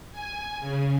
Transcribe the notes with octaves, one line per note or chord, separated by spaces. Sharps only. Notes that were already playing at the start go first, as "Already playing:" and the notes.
G#5
C#3